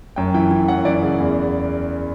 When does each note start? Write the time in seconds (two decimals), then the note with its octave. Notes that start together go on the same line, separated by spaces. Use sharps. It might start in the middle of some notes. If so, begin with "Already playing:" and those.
0.16 F#2 G5
0.34 E3 G5
0.51 E3
0.68 F#2 F#5
0.85 E3 D5
1.02 C#3
1.20 E2